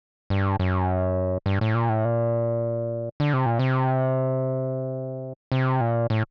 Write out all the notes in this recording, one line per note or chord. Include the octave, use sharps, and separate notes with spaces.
G2
F#2
G2
A2
A#2
A2
A#2
D3
C3
A#2
C3
C3
A#2
A2